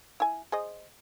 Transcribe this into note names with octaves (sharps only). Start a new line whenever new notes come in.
E4 G#5
G#4 C5 D#5